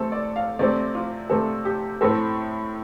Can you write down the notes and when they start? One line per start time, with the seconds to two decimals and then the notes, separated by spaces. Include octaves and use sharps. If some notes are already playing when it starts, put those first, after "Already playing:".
Already playing: C3 A3 C4 A4
0.12 D5
0.36 F5
0.59 C3 A3 C4 D5
0.95 F4
1.30 C3 A3 C4 A4
1.65 G4
2.01 A2 A3 C4 A4